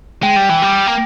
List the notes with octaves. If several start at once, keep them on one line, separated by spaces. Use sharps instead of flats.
G#3 G5
G3
E3
G3
A#3